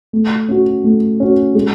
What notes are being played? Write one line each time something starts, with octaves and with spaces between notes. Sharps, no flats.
A3
C#4 F#4
A3
C#4 F#4
G#3